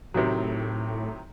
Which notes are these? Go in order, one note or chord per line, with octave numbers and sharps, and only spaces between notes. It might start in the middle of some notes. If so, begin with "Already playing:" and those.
A2 C3 D#3 F#3